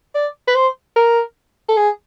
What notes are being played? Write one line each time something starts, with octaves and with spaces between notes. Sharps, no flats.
D5
B4
C5
A#4
A4
G#4